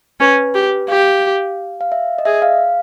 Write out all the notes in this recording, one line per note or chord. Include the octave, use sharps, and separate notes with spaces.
C#4 B4
G4
G4 F5
F5
E5
D#5
G#4 E5
F5